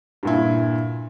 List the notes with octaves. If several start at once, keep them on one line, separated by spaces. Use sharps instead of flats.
G2 A#2 E4